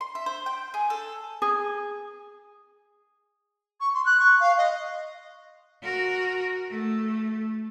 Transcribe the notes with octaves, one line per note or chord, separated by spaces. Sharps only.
C6
E5
C5
G5
G#4
A4
G#4
C#6
C6
F#6
C#6
F5
D#5
F#4 A#4
A3